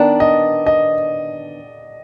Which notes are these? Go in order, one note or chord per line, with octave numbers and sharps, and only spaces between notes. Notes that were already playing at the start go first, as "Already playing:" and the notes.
Already playing: D#3 B3 D4 D5
D#5
D#5